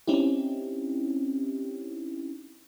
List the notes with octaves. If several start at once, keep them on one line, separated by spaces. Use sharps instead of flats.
C4 C#4 D#4 E4 G4